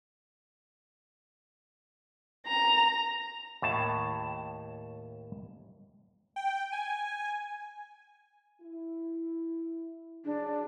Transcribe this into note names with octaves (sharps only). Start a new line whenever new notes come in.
A#5
D#2 A2 A5
G5
G#5
E4
C#3 F#3 D4 G#4